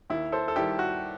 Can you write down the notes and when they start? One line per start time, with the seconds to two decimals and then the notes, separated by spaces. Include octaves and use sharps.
0.10 D#2 E4
0.32 A4 C5
0.48 A4
0.56 D#3 G3 E4 G4
0.79 F#4